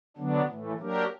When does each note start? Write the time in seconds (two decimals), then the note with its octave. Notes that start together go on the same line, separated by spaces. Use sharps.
0.17 D3 F#3 B3 D4
0.47 A2 E3 A3
0.79 F#3 A#3 D4 G4 A#4